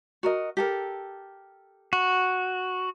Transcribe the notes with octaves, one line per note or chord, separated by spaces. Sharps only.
F#4 A#4 D#5
G4 A4 A#4
F#4